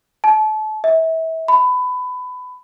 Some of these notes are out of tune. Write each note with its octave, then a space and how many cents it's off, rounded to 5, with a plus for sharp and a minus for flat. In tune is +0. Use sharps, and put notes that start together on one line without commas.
A5 -30
E5 -30
B5 +20